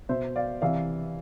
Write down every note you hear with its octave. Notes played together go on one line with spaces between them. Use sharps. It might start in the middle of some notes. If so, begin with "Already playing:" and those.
B2 C5 E5
D5 F5
C3 E3 D5 F5